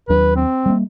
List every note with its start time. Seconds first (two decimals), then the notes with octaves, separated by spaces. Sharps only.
0.09 D#2 F#3 D4 B4
0.37 C4
0.66 G3 A#3